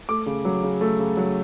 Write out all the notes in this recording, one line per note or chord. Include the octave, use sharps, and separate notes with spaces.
A3 D6
C#3
F#3
C#3
A3
C#3
F#3